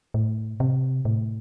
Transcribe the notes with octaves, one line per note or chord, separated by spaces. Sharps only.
A2
C3
A2